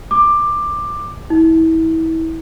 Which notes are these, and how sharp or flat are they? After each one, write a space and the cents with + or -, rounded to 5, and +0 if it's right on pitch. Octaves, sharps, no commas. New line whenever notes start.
D6 +15
E4 -30